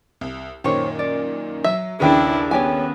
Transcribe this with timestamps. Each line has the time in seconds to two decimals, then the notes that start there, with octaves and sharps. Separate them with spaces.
0.21 C2
0.64 F#2 A#2 D#3 G4 C5 C#5
0.99 D5
1.64 F#3 E5
2.00 A#1 D#2 C#3 D4 E4 G#4 B4 G5
2.51 B3 F#4 G4 C#5 G#5